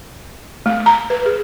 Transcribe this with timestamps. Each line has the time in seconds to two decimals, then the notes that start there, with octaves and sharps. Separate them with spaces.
0.66 A3
0.86 A#5
1.10 B4
1.26 G#4